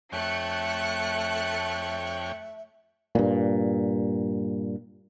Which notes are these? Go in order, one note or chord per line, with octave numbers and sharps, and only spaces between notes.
F2 A3 C#5 E5 G5 F#6 C#7
G2 A#2